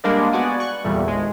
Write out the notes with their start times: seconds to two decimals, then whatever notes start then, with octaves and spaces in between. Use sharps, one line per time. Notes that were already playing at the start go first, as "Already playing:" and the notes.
0.04 G3 G#3 A#3 D4 A#4 D5
0.32 B3 F#4 D5 F#5 G#5
0.60 C#6 F#6
0.84 E2 A#2 G3 A3
1.08 G#1 G#3